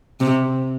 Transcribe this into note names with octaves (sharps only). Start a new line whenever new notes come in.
C3